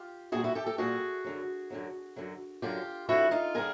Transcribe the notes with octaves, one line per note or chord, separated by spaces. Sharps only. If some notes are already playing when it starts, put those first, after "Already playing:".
Already playing: F4 G4
A#2 G3 F#4 G#4
E4 F#4
G4 A4
G4 A4
A#2 G3 F#4 G#4
F#2 D3 F#3
F#2 D3 F#3
F#2 D3 F#3
F#2 D3 F#3 F4 G4
F2 D3 G3 E4 F#4
D#4 F4
D3 G3 G#4 A#4